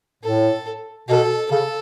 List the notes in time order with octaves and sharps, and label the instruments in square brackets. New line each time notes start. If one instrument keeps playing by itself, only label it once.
[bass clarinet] A2 [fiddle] A4
[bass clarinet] B2 [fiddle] A4
[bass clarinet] C#3 [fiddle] A4